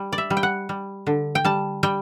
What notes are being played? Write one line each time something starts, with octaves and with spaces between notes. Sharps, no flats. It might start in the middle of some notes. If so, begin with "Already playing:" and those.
Already playing: G3
D5
E5
G3
G5
F#5
G3
D3
G5
G3 A5
G3 G5